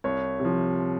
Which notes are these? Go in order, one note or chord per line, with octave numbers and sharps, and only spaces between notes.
C2 C#5
C3
F3